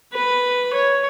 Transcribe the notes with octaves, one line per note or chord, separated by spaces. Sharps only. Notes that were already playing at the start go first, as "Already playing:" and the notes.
B4
C#5